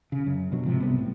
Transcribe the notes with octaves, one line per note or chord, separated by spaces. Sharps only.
C#3
F#2
F#2 B2 D3 F#3
F1 G#2 C3 F3
B1 C3 G3 B3
A2